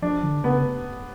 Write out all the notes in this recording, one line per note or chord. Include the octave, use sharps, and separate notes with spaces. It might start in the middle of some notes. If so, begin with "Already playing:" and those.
F3 D4
D3
C#3 B3